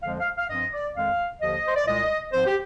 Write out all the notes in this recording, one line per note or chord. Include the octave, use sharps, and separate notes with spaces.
F2 D3 F3 G#3 F5
F5
F5
G2 F3 C4 D#5
D5
F2 D#3 G#3 F5
D#2 D3 F3 D#5
C5
D5
C2 A#2 G#3 D#5
G#2 F3 C4 C5
G4